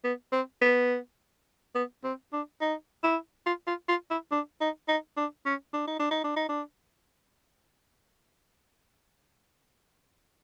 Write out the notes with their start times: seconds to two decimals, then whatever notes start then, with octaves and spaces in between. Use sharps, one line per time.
0.04 B3
0.32 C4
0.62 B3
1.75 B3
2.04 C4
2.33 D4
2.61 D#4
3.04 E4
3.46 F4
3.67 F4
3.89 F4
4.11 E4
4.32 D4
4.61 D#4
4.88 D#4
5.17 D4
5.46 C#4
5.74 D4
5.87 D#4
5.99 D4
6.11 D#4
6.24 D4
6.36 D#4
6.49 D4